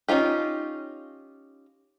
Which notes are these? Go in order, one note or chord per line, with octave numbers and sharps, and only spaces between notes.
C#4 D#4 F4 G4